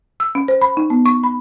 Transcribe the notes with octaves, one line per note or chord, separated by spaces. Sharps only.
E6
C#4
C5
B5
D#4
B3
C#6
B5